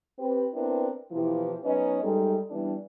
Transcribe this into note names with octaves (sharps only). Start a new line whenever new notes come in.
C4 G4 B4
B3 C4 D4 E4 A#4 B4
B2 E3 F3 A#3 E4 G4
F#3 B3 C#4 D#4 B4 D#5
F#2 G3 G#3 D#4 A4
E3 G3 B3 D4